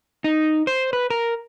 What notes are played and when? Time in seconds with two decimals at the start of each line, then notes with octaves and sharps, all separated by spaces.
0.24 D#4
0.67 C5
0.93 B4
1.10 A#4